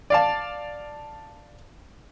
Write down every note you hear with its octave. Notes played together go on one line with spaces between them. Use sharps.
D5 F5 A5